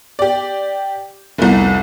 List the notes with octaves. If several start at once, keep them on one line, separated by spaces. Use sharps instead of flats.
G4 D5
F1 C2